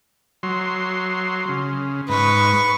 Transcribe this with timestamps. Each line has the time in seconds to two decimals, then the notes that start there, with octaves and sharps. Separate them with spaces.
0.43 F#3 C6
1.49 C#3
2.09 G#2 B4 C#6